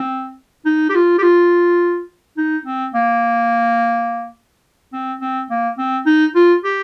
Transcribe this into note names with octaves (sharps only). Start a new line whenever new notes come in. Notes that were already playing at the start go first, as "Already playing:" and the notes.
Already playing: C4
D#4
G4
F4
G4
F4
D#4
C4
A#3
C4
C4
A#3
C4
D#4
F4
G4